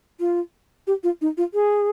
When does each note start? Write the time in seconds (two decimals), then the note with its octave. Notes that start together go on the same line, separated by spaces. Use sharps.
0.20 F4
0.87 G4
1.03 F4
1.21 D#4
1.37 F4
1.54 G#4